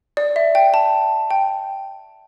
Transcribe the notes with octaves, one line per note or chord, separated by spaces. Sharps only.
D5
E5
G5
A5
G5